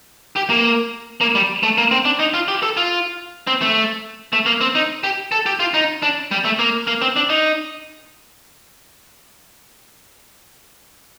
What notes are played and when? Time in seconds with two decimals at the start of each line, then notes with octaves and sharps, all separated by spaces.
0.36 G4
0.49 A#3
1.21 A#3
1.35 G3
1.63 A3
1.78 A#3
1.91 C4
2.05 D4
2.19 D#4
2.34 F4
2.48 G4
2.62 A4
2.77 F4
3.47 C4
3.61 A3
4.33 A3
4.46 A#3
4.61 C4
4.75 D#4
5.04 G4
5.32 A4
5.46 G4
5.60 F4
5.74 D#4
6.02 D4
6.31 G3
6.45 A3
6.59 A#3
6.87 A#3
7.02 C4
7.16 D4
7.30 D#4